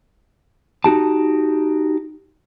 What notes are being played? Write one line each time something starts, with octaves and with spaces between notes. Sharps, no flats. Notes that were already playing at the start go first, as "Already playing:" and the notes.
D#4 F#4 G4 A5